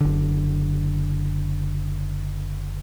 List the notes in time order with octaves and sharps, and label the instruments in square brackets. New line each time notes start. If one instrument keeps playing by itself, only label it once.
[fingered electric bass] F#1 D3